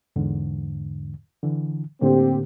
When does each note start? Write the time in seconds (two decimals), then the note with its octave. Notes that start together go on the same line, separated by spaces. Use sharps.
0.16 E2 G#2 D3
1.43 D3 E3
2.01 A2 D3 A#3 C4 G4